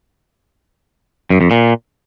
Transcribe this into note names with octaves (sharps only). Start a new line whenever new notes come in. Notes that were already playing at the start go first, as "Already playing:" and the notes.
F#2
F2
A#2